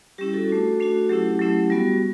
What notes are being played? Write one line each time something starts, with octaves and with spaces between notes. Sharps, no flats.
G3 C#4 E4 G4
F#4 A4
A3 D4 F#4
A3 D4 F#4
F#3 A3 C#4 E4 G4
F#3 A3 C#4 E4
G3 B3 F#4